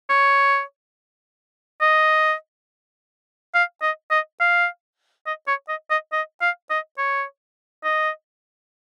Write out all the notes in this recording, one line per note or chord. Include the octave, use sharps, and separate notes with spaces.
C#5
D#5
F5
D#5
D#5
F5
D#5
C#5
D#5
D#5
D#5
F5
D#5
C#5
D#5